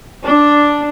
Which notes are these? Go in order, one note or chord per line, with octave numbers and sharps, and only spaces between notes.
D4